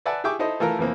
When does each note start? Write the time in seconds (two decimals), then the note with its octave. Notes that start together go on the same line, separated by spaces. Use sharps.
0.05 B4 D5 E5 F#5 G#5 A5
0.24 G4 G#4 E5 G5 C#6 D6
0.39 D#4 E4 A4 C5 D#5
0.60 E3 A3 F4 A4 A#4 A#5
0.79 F2 E3 A#3 C4